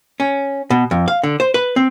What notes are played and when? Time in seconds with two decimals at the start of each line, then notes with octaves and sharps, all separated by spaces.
0.20 C#4
0.70 B2
0.91 F2
1.08 F5
1.23 D3
1.40 C5
1.54 B4
1.76 C4